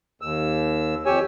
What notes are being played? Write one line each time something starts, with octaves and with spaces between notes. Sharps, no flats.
D#2 E6
F2 G4 C#5 G#5 E6